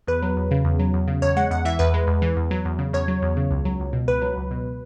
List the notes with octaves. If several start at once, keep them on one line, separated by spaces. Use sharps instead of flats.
E2 B4
F#3
E2
C#3
E2
F#3
E2
C#3
E2 C#5
G#3 F#5
E2 F#5
E3 E5
E2 B4
G#3
E2
E3
E2
F#3
E2
C#3
E2 C#5
F#3
E2
C#3
C#2
F#3
C#2
B2
C#2 B4
F#3
C#2
B2